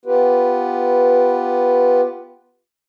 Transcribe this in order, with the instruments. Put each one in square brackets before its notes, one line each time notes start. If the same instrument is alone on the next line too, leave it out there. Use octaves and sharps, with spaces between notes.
[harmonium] B3 F4 G4 B4